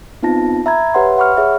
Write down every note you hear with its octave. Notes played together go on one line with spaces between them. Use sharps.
B3 C4 D#4 F4 A5 A#6
E5 A#5 B5 G#6
G4 B4 C#5 E5 F#5 C6
F#5 B5 C#6 F6
G#4 C#5 E5